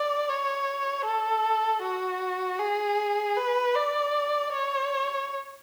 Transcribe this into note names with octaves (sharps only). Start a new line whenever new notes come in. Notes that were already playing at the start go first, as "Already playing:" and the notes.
Already playing: D5
C#5
A4
F#4
G#4
B4
D5
C#5